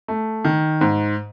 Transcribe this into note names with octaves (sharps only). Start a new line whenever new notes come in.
A3
D#3
G#2